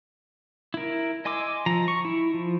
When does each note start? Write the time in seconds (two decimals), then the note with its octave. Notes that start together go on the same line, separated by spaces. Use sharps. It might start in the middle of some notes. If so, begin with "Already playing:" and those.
0.74 E4 A#4
1.25 D#5 G#5 C6 D6 E6
1.66 F3 A#5
1.88 C#6
2.05 E4
2.34 F3